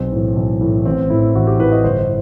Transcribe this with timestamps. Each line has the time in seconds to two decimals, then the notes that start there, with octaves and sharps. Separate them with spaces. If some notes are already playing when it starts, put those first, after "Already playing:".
Already playing: B1 C4
0.12 A2 E3
0.36 B1
0.61 A2 E3
0.85 A1 C4
1.10 A2 E3 E4
1.35 A1 F#4
1.47 G4
1.59 A2 E3 B4
1.72 D#5
1.84 G1 C5